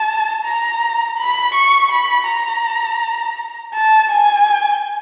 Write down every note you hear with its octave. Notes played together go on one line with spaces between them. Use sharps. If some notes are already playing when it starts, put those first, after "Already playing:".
Already playing: A5
A#5
B5
C#6
B5
A#5
A5
G#5